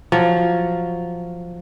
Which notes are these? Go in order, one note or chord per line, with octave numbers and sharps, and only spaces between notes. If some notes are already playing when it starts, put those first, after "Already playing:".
F3 F#3